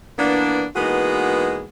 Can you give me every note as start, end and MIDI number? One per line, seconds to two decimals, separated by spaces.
0.19 0.65 52
0.19 0.65 58
0.19 0.65 59
0.19 0.65 62
0.76 1.64 52
0.76 1.64 56
0.76 1.64 58
0.76 1.64 59
0.76 1.64 63
0.76 1.64 66